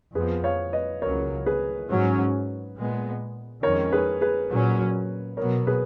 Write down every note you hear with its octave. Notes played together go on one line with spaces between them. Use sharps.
F2 F3 B3 G#4 B4
C#5 F5
B4 D#5
C#2 C#3 F#3 A#4 C#5
G#4 B4
G#2 F#3 C#4
A#2 G#3 B3
F2 D#3 G#3 C#4 A#4 C#5
G#4 B4
G#4 B4
A#2 F#3 C#4
B2 F#3 B3 A#4 C#5
G#4 B4